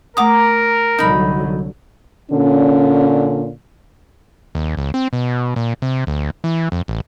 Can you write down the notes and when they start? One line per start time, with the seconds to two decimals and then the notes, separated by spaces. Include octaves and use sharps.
0.17 A3 A#4 F#5 A#5 D6 D#6
0.99 C2 D3 F#3 D#4 B5
2.31 A#2 D3 C#4
4.55 D#2
4.77 C#2
4.94 C4
5.13 B2
5.56 A#2
5.82 C3
6.07 D2
6.44 E3
6.72 F2
6.88 A1